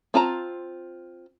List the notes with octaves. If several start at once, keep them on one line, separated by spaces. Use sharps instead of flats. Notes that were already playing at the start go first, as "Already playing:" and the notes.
C4 F4 A5 A#5